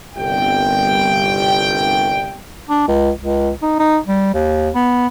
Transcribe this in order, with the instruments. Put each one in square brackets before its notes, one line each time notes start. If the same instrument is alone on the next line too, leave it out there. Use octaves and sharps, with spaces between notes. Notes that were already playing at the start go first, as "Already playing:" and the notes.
[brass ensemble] G1 C2 G5
[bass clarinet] D4
C#2
C#2
D#4
D#4
G3
D#2
B3